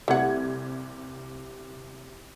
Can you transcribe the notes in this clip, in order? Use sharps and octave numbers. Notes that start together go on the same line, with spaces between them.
C2 C3 A3 F#5 G#6